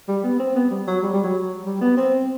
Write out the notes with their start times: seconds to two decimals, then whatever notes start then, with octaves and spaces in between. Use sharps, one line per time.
0.08 G3
0.24 B3
0.40 C4
0.56 B3
0.71 G3
0.87 F#3
1.03 G3
1.14 G3
1.24 F#3
1.65 G3
1.81 B3
1.97 C4